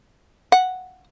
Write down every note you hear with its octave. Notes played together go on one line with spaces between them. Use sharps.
F#5